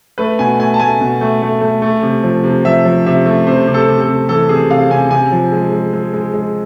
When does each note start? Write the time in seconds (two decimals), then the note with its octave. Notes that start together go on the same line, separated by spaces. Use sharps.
0.18 A3 B4
0.39 B2 G#5
0.59 A3 G#5
0.74 A5
0.80 A3 G#5
1.01 B2
1.21 A3
1.42 A3
1.61 A3
1.82 A3
2.02 C3
2.23 F3
2.44 C3
2.65 F3 E5
2.85 F3
3.06 C3 E5
3.26 A3
3.47 C3 C5
3.68 C3
3.74 A4
3.88 C3
4.01 A4
4.08 C3
4.29 E3 A4
4.49 C3 G#4
4.70 C3 F5
4.90 C3 G#5
5.11 C3 G#5
5.32 F3
5.52 G#3
5.72 G#3
5.93 G#3
6.14 G#3
6.34 G#3